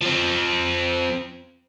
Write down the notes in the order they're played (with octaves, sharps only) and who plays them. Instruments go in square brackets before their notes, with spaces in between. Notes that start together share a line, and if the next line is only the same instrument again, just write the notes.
[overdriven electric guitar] F3 C4